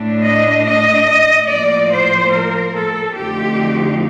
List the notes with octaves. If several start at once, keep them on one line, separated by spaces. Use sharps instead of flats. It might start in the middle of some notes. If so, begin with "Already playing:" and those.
Already playing: A2 A3 D4
D#5
D#5
A2 F3 A#3 D5
C5
A#4
A4
F2 D3 F3 A3 D#4 G4